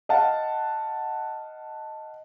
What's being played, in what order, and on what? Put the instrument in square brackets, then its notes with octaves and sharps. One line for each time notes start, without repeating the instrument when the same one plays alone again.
[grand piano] D#5 F5 F#5 A5